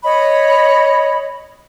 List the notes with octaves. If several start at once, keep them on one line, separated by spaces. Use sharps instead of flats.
C#5 D#5 B5